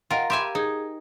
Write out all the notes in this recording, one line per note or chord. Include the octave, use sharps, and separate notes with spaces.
F4 A#4 D#5 F#5 G5
G4 E5 F5 G#5 B5 C6
F5 A#5
D#4 G#4 G#6